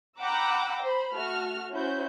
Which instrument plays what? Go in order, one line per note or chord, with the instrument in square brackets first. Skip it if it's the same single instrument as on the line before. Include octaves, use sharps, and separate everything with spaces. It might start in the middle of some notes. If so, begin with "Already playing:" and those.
[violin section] F#5 G5 A#5 B5 D6 E6
C5 B5
A3 F#4 F6
C#4 E4 F#4 C5 G6